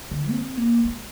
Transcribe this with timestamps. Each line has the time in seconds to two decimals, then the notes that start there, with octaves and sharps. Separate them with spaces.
0.11 D3
0.30 C4
0.57 A#3
0.85 G#3